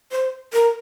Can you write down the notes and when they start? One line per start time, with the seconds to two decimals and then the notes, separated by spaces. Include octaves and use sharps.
0.12 C5
0.53 A#4